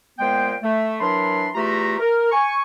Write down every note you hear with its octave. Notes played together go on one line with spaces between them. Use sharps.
A#2 G#3 B3 C5 G5
A3
E3 F#3 D4 A#4 B5 C6
E2 A3 F4 G4 A#5
A#4
G#5 C#6